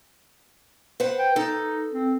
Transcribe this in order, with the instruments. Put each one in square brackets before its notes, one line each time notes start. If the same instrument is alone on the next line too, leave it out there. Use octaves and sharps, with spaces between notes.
[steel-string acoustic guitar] B4 C5 F#5
[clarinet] G5
[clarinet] D#4 [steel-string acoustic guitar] A4
[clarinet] C4